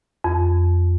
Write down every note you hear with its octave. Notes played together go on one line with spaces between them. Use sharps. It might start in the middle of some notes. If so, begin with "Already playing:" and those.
F2